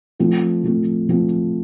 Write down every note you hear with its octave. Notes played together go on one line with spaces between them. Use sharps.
F3 A3 C4
F3 A3 C4
F3 A3 C4